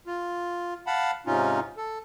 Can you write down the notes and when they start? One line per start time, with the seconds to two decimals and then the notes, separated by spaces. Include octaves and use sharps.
0.07 F4
0.87 F5 F#5 A5 B5
1.26 G#2 C3 C#4 D#4 F4
1.77 A4